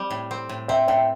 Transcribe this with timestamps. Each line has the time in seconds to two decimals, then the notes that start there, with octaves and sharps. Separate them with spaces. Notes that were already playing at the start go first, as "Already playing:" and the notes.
Already playing: G3 C4
0.11 A2
0.31 C4
0.49 A2
0.68 C4 E5 G5
0.88 A2 E5 G5